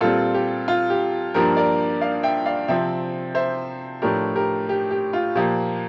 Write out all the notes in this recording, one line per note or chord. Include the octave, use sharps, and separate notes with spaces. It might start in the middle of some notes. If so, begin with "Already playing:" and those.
A#2 G3 C4 F4 A4
G4
F4
G4
G2 F3 A#3 D4 G4 A#4
A#4 D5
D5 F5
E5 G5
D5 F5
C3 F3 C4 E5 G5
C5 E5
A2 F3 A3 D4 G4 A#4
G4 A#4
G4
G4
F4
A#2 F3 A#3 G4